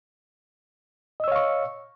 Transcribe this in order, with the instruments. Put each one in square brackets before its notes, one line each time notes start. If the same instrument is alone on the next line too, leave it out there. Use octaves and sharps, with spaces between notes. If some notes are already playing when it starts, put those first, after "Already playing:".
[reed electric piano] D#5
E6
C#5
F5
C#6